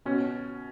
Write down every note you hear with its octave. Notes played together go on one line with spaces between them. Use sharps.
B2 C#4